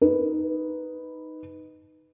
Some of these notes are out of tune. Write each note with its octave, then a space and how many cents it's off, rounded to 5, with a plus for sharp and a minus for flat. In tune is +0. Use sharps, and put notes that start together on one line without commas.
D#4 +0 B4 +0